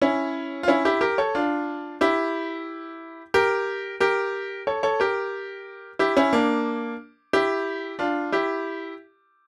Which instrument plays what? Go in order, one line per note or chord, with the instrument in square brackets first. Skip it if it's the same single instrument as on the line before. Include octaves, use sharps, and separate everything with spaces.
[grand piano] C#4 E4
F4
C#4 E4
E4 G4
G4 A#4
A4 C#5
D4 F4
E4 G4
G4 A#4
G4 A#4
A4 C#5
A4 C#5
G4 A#4
E4 G4
C#4 E4
A#3 D4
E4 G4
D4 F4
E4 G4